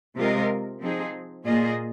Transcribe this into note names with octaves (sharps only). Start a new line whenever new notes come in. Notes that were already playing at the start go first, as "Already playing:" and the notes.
C3 G#3 F4 A#4 D#5
F3 C4 D#4 G#4
A#2 A#3 F4 G#4 D#5